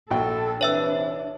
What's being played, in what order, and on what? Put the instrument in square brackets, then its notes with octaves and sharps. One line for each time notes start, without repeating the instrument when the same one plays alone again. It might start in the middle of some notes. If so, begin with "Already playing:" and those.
[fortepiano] A#1 F#4 G5 [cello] A4
[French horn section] C3 E3 B4 [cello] D4 [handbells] C#5 E5 E6